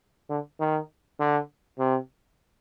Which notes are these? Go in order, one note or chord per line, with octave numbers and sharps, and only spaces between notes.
D3
D#3
D3
C3